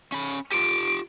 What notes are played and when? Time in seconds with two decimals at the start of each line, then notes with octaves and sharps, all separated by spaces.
0.12 C#4 B5
0.52 F4 G4 D7